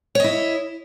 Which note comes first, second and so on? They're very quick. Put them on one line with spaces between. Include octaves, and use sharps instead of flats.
C#5 D#5 E4